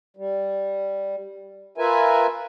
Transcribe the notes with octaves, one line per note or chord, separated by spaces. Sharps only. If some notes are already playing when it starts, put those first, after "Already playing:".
G3
F4 A#4 B4 E5 G#5